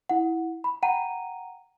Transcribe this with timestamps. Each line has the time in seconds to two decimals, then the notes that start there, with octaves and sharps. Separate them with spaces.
0.09 E4 F#5
0.64 B5
0.83 F#5 G5 A#5 D#7